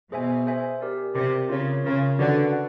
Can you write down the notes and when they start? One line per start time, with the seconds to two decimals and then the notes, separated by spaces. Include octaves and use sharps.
0.12 B2 G#4 C5 E5 G#5
0.46 G#4 C5 E5 G#5
0.81 G4 A#4 D5
1.15 C3 G4 A#4 D5
1.49 C#3 F4 A#4 C#5
1.84 C#3 F4 A#4 C#5
2.18 D3 D4 F#4 B4 D5 F#5
2.53 D5 F#5